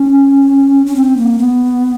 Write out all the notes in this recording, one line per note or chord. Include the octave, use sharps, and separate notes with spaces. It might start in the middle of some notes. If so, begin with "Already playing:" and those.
Already playing: C#4
C#4
C4
A#3
B3